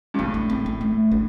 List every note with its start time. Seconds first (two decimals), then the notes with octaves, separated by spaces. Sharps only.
0.14 G2
0.18 A2 C4
0.34 D4
0.50 C4
0.66 A3
0.81 A3
1.12 D4